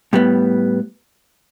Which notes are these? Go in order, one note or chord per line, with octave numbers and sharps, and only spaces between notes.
A2 G3 B3